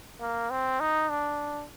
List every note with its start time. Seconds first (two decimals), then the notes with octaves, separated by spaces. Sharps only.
0.20 A#3
0.50 C4
0.80 D#4
1.10 D4